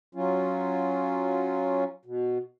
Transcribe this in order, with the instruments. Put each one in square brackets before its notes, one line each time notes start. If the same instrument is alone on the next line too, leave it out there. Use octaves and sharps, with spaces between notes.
[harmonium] F#3 C#4 F4
B2